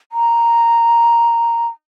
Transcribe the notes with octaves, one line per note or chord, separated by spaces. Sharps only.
A#5